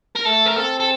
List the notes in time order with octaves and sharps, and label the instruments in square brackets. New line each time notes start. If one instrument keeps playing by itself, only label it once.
[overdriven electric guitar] A#4
[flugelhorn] A3 [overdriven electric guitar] A4
[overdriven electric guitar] A#4
[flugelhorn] C4 [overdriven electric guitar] A4
[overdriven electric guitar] A4